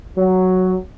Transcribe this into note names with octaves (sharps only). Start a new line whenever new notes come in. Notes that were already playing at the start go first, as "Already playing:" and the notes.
F#3